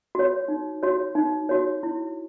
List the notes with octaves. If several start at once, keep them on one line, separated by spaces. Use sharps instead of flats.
F#4 C#5
D#4
F#4 C#5
D#4
F#4 C#5
E4